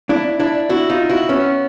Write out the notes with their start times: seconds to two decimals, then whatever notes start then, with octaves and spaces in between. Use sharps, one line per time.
0.09 D4 E4
0.39 D4 E4
0.69 E4 F#4
0.90 D#4 F4
1.09 E4 F#4
1.29 B3 C#4